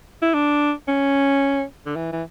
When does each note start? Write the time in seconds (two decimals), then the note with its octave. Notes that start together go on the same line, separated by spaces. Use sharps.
0.22 E4
0.34 D4
0.88 C#4
1.86 D3
1.96 E3
2.12 E3